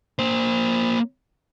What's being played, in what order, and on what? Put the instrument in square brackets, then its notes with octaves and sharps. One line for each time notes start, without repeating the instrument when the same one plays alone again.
[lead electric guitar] A#3 C5